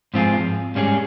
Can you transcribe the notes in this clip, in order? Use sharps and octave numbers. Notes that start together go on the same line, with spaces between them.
G#2 F3 C4 F4 G#4
G#2 G3 C#4 G#4